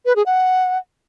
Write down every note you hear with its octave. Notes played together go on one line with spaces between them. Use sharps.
B4
G#4
F#5